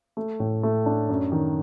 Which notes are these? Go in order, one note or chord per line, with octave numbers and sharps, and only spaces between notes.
A3
A2
A3
D4
F#2
D#3